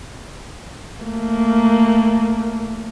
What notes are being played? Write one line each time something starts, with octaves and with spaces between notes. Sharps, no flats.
A3 A#3